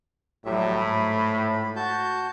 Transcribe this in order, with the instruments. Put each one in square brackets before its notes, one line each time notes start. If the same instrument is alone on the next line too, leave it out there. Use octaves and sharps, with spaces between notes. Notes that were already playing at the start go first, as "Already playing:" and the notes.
[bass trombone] A2 [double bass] F#3 G3 [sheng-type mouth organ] G4 E5
[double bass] G#2 A3 [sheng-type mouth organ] B5
[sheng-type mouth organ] F#4 A5 G6